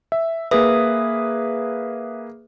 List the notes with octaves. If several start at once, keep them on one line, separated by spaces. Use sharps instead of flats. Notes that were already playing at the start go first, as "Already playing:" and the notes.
E5
A#3 G#4 B4 E5 D#6